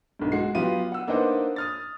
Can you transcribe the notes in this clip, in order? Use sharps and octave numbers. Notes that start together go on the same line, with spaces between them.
B1 G2
G#3 F#4 C7
F#3 B3 F4 G4 D#7
F#5 E6
A#3 D4 D#4 B4 C5 F#5
D#6 F6 A6